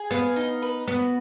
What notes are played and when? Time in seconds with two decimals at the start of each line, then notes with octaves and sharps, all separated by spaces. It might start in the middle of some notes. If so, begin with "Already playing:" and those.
Already playing: G#4
0.11 B3 F5
0.36 D#4
0.62 B4
0.88 B3 F#4